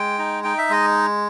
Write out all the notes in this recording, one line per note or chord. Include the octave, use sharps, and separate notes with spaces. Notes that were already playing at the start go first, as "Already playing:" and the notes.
Already playing: G#3 G5
D#4
D#4 G5
E5
G#3 D#5